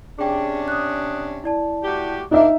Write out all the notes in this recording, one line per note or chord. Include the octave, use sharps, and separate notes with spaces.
C3 C#4 D4 G#4 G5
D#6 F#6
E4 D5 A5
A2 F#4 G4
A#3 D4 D#4 E5